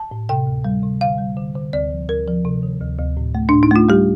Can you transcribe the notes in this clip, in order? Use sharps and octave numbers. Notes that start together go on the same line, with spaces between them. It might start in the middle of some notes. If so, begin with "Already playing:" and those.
Already playing: A5
A2
C3 G5
D2
G3
C3
D3 F5
G3
D3
D3
D2 D5
F3
D2 A#4
F3
C3
D#3
D2
D2
A2
A3
A2 D4
D#4
A3 F4
G3 G4